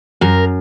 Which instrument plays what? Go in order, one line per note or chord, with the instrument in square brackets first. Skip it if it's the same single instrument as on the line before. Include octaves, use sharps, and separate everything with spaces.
[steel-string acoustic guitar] F#2 A#4